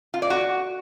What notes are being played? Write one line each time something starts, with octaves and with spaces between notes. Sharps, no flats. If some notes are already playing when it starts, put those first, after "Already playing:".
F4
D5
F#4